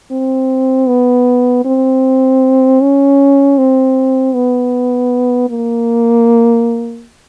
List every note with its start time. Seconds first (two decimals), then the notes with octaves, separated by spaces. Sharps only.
0.11 C4
0.88 B3
1.65 C4
2.81 C#4
3.58 C4
4.35 B3
5.50 A#3